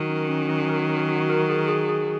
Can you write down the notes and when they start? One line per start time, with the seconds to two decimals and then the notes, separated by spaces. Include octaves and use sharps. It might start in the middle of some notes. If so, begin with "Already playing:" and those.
Already playing: D#3 F#3 A#4
0.09 C#4
0.29 C#4
0.49 C#4
0.69 A#4
0.89 C#4
1.09 F#4
1.29 A#4
1.50 G#4
1.68 G#4
1.89 G#4